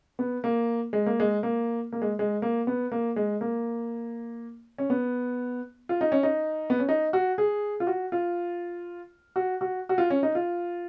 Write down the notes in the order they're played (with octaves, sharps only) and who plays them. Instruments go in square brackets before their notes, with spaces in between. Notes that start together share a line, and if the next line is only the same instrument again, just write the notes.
[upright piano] B3
A#3
G#3
A#3
G#3
A#3
A#3
G#3
G#3
A#3
B3
A#3
G#3
A#3
C#4
B3
F4
D#4
C#4
D#4
B3
C#4
D#4
F#4
G#4
F4
F#4
F4
F#4
F#4
F#4
F4
C#4
D#4
F4